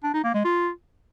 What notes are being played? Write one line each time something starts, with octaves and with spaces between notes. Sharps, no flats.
D4
D#4
A#3
G#3
F4